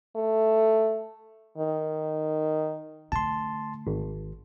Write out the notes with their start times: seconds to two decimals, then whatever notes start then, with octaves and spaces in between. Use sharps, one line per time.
0.16 A3
1.58 D#3
3.12 D3 A3 A5 C6
3.87 G#1